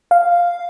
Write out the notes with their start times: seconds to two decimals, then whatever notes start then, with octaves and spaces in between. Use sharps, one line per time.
0.11 F5